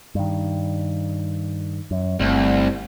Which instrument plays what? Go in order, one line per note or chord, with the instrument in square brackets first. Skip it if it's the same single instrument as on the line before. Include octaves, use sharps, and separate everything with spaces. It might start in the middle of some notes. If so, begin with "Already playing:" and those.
[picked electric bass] G2 D#3
F#2
[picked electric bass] G1 A3 [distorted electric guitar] C2